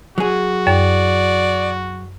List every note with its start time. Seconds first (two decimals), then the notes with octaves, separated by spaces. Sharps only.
0.18 F#3 F#4 G#4
0.67 F#2 D5